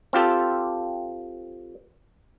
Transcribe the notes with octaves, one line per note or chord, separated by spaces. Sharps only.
C4 F4 G4 A4